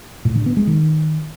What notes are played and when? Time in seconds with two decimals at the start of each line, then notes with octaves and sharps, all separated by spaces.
0.25 A2
0.36 D3
0.46 B3
0.57 G#3
0.67 D#3